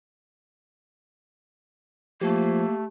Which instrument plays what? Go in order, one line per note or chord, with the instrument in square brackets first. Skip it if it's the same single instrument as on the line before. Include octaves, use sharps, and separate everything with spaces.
[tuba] F3 [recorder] A3 [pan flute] A#3 [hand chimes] G4